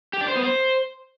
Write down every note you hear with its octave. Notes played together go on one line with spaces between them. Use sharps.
G4
D4
C5
B3
C5